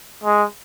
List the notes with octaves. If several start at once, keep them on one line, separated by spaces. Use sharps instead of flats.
G#3